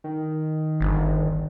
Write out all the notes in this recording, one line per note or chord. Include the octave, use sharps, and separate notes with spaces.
D#3
G1